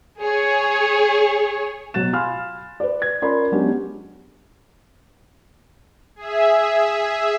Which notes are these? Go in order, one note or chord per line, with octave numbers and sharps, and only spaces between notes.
G#4 C#5
B2 F#3 F#6 A6 E7
F5 G#5 B5 C6 F6
B4 D5
G#6
C#4 F4 A#4 D5 B5 C6
F#3 G#3 B3 C#4 D4 G4
G#4 E5